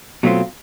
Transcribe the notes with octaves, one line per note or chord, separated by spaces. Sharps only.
B2 F#3 A3 C4 F4